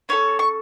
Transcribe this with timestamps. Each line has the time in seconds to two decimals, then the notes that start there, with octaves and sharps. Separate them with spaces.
0.09 C#4 F4 A4 C#5 C#6
0.39 C#6